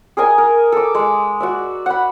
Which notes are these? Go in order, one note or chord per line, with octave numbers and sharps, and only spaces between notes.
G#4 A#4 D#5 G#5
A#4
A4 D6
G#3
F#4 D5 E5
F#5 B5